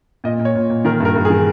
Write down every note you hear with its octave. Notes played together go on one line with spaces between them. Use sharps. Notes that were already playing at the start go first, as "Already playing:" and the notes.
A#2 D#5
A#2
C#5
A#2
A#2
D#3 A#4
G2 A#4
G2
G#4
D#3